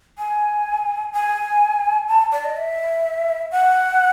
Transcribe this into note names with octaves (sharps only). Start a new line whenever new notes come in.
G#5
G#5
A5
D5
D#5
E5
F#5